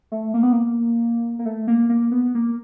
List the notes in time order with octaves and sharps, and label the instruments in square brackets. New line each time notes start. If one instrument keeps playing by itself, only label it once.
[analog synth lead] A3
A#3
B3
A#3
A#3
A3
A#3
A#3
B3
A#3